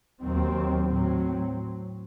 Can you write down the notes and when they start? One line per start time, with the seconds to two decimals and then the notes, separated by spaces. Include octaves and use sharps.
0.19 D#2 D#3 F#3 C4
0.86 A2 F#3 C4